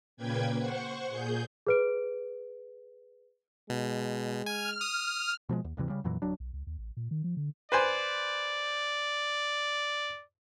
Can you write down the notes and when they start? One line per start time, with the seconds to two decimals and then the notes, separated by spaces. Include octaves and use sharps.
0.17 A#2 C#3 A#3 B4 G5 G#6
0.57 C5 F#5 C#6
1.09 A#2 G#4 G6
1.67 G#4 B4 D7
3.70 B2 G#3
4.46 G#5 F6
4.81 D#6
5.49 B2 F3 F#3 G#3
5.65 D#2
5.77 D2 G2 C3 E3
5.89 C#3 G3
6.04 F2 A#2 E3 F#3
6.22 D1 F#3 D4
6.40 B1
6.53 C#2
6.67 D#2
6.78 A1
6.97 A#2
7.11 D#3
7.24 F3
7.37 D3
7.72 B4 C5 D5 G#5